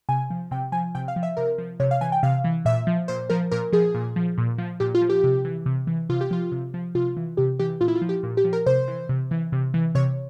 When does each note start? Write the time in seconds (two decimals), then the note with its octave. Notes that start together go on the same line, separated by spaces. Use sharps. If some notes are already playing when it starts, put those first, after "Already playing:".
0.09 C3 G#5
0.30 F3
0.51 C3 G5
0.72 F3 G#5
0.95 C3 G5
1.08 F5
1.16 F3
1.23 E5
1.37 C3 A#4
1.58 F3
1.80 C3 C#5
1.91 F5
2.01 E3 G#5
2.12 G5
2.23 C3 F5
2.44 E3
2.65 A#2 E5
2.87 F3
3.08 A#2 C5
3.30 F3 A#4
3.51 A#2 A#4
3.73 F3 G#4
3.94 A#2
4.16 F3
4.38 A#2
4.58 F3
4.80 A#2 G4
4.95 F4
5.01 F3
5.10 G4
5.24 C3
5.45 E3
5.66 C3
5.87 E3
6.09 C3 F4
6.21 G4
6.31 F3 F4
6.52 C3
6.74 F3
6.95 C3 F4
7.17 E3
7.37 C3 G4
7.59 E3 G4
7.81 A#2 F4
7.88 E4
7.96 F4
8.02 F3
8.09 G4
8.23 A#2
8.37 G4
8.44 F3
8.53 A#4
8.66 C3 C5
8.88 E3
9.09 C3
9.31 E3
9.52 C3
9.74 E3
9.95 C3 C#5